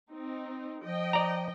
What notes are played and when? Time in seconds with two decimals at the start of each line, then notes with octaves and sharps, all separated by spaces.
0.10 C4 D#4
0.84 F3 D#5 G5
1.13 D5 A#5